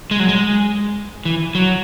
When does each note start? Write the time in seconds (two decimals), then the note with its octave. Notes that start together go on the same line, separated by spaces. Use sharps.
0.11 G#3
0.20 F#3
0.29 G#3
1.25 E3
1.55 F#3